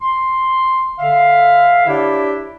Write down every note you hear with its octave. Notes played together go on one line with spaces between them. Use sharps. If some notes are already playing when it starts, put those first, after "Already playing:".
C6
D3 E5 F5
D4 E4 G4 C#5 D5 E5